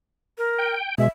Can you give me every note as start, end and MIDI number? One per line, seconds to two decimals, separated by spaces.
0.38 0.74 70
0.58 0.95 79
0.98 1.08 47
0.98 1.08 56
0.98 1.07 76